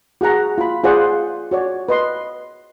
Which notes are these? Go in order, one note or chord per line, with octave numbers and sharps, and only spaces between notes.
F#4 G#4 F#5 A#5
F4 B5
F4 G#4 C5 D5 F#5
F#4 C#5 D5
B4 D#5 C6